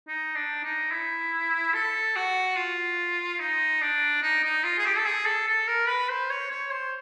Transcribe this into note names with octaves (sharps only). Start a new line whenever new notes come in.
D#4
D4
D#4
E4
A4
F#4
F4
D#4
D4
D#4
D#4
F4
G#4
G4
A4
G#4
A4
A4
A#4
B4
C5
C#5
C#5
C5